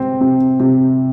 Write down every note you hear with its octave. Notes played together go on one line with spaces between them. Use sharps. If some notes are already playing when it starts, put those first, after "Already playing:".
Already playing: C3 C4
C3
C3